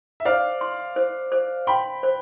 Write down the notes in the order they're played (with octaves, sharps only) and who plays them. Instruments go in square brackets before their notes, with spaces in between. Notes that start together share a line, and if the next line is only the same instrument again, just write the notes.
[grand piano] E5
[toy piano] C5 [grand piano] D5 F5
[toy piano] C6
C5
C5
[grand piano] G5 B5 [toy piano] C6
[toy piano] C5